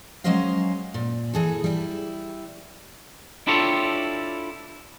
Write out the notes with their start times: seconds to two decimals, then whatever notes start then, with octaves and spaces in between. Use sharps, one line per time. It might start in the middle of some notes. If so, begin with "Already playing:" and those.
0.24 F#3 G#3 C#4 C5 D#5 F5
0.94 A#2
1.34 E3 G#4 A4
1.64 G3 E4
3.47 D4 E4 F4 G4 A4 C#5